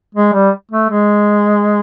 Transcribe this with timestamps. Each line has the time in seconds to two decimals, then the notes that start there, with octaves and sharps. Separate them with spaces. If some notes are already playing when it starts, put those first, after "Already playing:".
0.15 G#3
0.33 G3
0.71 A3
0.89 G#3